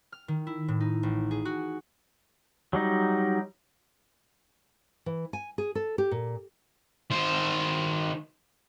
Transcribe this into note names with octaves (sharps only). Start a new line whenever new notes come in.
F6
D#3
E4
A2
D#4
A1
G#4
F#4
F#3 G3 D#4
E3
G#5
G#4
A4
G4
A#2
D#3 C5